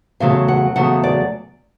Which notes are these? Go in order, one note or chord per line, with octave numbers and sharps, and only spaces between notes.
E2 C#3 F#3 A3 F5
F#5
E2 C#3 F#3 A3 F#5
D5